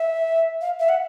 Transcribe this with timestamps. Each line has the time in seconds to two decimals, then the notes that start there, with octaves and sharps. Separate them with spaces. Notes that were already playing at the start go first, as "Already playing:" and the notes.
Already playing: E5
0.61 F5
0.80 E5
0.89 F#5